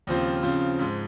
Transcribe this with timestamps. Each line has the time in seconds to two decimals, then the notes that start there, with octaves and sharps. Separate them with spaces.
0.07 D#2 C#3 F3 C4 F4
0.43 C#3 F3 C4 F4
0.79 G#2 F3 G#3